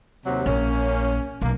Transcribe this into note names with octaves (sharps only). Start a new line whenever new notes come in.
D#2 C3 F#3
A#1 A#3 C#4
B1 A#3